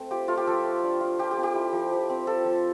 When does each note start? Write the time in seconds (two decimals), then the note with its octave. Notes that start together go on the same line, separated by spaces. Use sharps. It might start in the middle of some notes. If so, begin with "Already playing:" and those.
Already playing: A3 C4
0.11 F4 G4
0.28 A3 F4
0.37 G4
0.47 F3 A4
0.65 A3
0.84 D4
1.01 F4
1.19 F3 G4
1.31 G4
1.37 C4
1.43 G4
1.55 E4
1.73 F3
1.91 F3
2.09 C4
2.27 F4 A4
2.45 F3